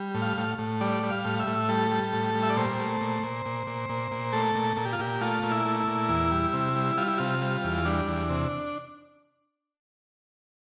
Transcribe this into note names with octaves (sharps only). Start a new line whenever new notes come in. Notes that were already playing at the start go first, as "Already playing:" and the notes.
Already playing: G3
A2
F5
A2
A2
G3 D5
G3
F5
A2
E5
A2
G3 A4
G3
A2
G3
E5
D5
A#2 C5
A3
A#2
A#2
A#2
A#2
A#2
A#2
A3 A4
A#2
A#2 A4
G4
F4
A#2 G4
A3 F4
A#2
E4
A3
E4
A#2
E2
G3
C3
G3
G3 F4
E4
C3 F4
G3
E2
G3 D4
E2
C3